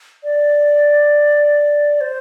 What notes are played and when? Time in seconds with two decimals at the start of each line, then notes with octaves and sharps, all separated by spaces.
0.23 D5
2.01 C5